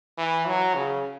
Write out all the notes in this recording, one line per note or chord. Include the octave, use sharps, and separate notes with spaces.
E3
F#3
C#3